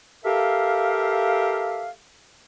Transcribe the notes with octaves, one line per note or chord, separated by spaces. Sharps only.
G4 A4 A#4 E5 F5